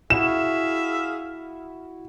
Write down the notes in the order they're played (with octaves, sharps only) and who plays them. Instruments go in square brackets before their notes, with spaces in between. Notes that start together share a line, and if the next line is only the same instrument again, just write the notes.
[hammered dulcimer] E4 F#4 [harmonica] G#4 E5 F5 [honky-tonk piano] E7